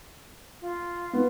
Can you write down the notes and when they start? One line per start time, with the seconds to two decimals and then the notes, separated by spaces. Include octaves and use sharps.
0.61 F4
1.13 B3